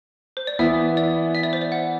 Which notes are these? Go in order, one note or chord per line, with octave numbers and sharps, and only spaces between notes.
C5
D5
E3 B3 E4 E5
D5
E5
D5
C5
D5
F#5